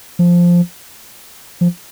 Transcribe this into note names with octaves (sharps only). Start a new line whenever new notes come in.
F3
F3